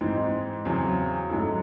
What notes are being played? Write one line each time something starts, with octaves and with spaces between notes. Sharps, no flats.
G#2 E3 C4 D#4
E2 C#3 F#3 C4
G#2 F#3 C#4 E4 A4